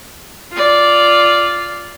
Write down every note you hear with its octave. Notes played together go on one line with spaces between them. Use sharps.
F4 D5